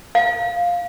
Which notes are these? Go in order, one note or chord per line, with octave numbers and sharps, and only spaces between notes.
F5